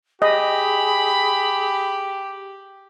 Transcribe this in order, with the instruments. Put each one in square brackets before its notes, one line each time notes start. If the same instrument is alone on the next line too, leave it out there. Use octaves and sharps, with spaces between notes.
[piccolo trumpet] G4 [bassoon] G#4 [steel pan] D#5 [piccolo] B5